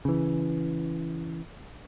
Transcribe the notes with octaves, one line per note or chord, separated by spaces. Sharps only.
C#3 E3